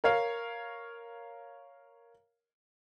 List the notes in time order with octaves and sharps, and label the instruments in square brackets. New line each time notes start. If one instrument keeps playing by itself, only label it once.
[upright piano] A#4 C#5 F5